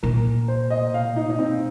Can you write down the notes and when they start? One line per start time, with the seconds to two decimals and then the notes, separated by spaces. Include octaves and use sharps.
0.03 A#2 A#4
0.48 C5
0.70 D#5
0.94 F5
1.16 D#4
1.30 D#4
1.39 C4